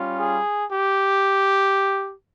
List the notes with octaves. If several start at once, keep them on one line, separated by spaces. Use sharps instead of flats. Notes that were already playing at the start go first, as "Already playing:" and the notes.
Already playing: G3 C#4 F4
G#4
G4